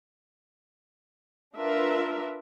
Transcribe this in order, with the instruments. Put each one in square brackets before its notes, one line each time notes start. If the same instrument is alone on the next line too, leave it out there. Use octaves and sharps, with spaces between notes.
[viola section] D4 F4 A#4 B4 E5